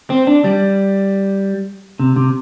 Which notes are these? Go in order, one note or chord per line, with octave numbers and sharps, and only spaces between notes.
C4
D4
G3
C3
C3